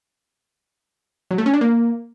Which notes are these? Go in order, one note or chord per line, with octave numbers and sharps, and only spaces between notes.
F#3
A3
C#4
D4
A#3